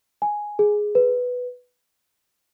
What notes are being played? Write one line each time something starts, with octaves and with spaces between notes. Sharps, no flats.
G#5
G#4
B4